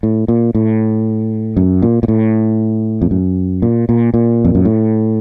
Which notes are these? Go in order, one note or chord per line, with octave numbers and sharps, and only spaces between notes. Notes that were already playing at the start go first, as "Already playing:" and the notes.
A2
A#2
A2
F#2
A#2
A#2
A2
F2
F#2
A#2
A#2
A#2
F2
F#2
A2